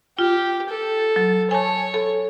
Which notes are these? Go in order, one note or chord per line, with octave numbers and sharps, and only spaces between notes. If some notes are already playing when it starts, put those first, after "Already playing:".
F4 G4
A4
F#3
C#5 G#5 A5
A4